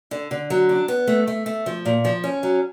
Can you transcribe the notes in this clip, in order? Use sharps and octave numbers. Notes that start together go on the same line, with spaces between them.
D3
D3
F#3
D4
B3
A3
A3
A3
F3
A#2
F3
C#4
F#3